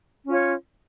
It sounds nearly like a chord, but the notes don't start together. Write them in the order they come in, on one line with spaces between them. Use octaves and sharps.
C#4 F4 C#5